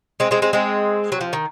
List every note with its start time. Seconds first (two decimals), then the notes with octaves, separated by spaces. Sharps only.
0.20 G#3 C4
0.31 G#3 C4
0.42 G#3 C4
0.53 G#3 C4
1.12 F#3
1.21 F3
1.33 D#3